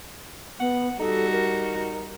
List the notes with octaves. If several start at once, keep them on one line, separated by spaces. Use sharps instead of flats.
B3 F#5
G3 D#4 F#4 A4
A#4